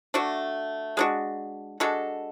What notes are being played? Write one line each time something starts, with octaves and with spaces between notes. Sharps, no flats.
A3 D4 F#4
G#3 D4 F#4
G#3 D4 F#4 A4